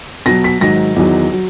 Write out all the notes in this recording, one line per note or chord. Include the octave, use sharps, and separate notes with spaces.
B2 F#3 A#6
B6
G#2 D#3 F#3 A#6
E2 D#3 F#3
F#3